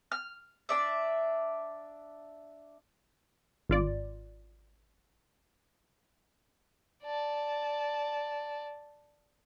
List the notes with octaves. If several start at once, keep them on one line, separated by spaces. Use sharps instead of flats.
F6
D4 D5 E5
G#1 F4 D5
D5 A5